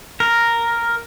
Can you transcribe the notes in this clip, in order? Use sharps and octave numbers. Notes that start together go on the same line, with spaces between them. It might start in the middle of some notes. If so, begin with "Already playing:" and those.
A#4